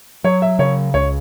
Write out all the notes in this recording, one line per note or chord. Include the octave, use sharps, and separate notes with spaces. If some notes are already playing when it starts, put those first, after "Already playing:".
F#3 C#5
E5
C#3 C#5
C#2 C#5